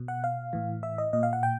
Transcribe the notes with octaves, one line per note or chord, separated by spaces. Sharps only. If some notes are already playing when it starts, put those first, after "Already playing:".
Already playing: B2
F#5
F5
A2 E3
E5
D#5
A#2 D#5
F5
F#5
G5